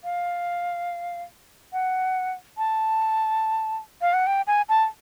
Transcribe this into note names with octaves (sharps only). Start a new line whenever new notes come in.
F5
F#5
A5
F5
F#5
G5
G#5
A5